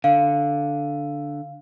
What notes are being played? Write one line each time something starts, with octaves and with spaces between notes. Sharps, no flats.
D3 F5